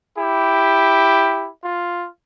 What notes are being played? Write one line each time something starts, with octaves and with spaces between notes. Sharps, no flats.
E4 G4
F4